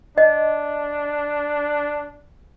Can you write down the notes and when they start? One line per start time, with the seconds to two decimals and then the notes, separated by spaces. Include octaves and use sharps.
0.18 D4 D#5